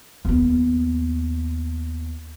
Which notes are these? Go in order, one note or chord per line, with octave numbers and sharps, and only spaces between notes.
D#2 B3